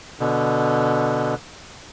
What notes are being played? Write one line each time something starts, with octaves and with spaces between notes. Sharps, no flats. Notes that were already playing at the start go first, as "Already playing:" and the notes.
B2 D3